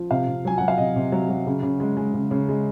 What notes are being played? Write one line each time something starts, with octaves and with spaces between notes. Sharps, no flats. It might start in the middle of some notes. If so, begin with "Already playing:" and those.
Already playing: F3
C3 F5
C3
F#3 G#5
F#3 F#5
F5
C3 D#5
C3
F#3
F#3
C#3
C#3
G#3
G#3
C#3
C#3
G#3